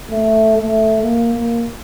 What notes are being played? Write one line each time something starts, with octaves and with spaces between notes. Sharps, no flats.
A3
A3
A#3
A#3